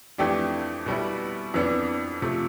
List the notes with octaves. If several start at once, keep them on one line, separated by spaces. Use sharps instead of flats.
F2 E3 A3 D4 G4
B2 G3 B3 E4
F2 E3 B3 D4
C3 F3 A3